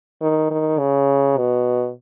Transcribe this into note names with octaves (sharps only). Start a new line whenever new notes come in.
D#3
D#3
C#3
B2